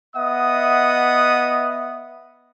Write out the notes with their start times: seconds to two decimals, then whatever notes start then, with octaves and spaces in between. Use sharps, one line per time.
0.16 B3 D#5 E5 F#5 D#6